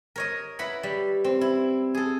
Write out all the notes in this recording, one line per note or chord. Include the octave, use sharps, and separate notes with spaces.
A#4 C#5 D#5
E4 B4 F#5 B5
G3
C4
E4
G#4 A4